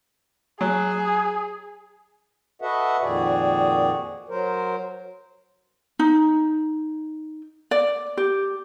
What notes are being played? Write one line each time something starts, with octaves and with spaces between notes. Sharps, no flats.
F#3 G#4
F#4 A4 B4 D#5 E5 F#5
F2 A#2 D#3 F#4 G#4 D5
F#3 A#4 C5
D#4
D5
G4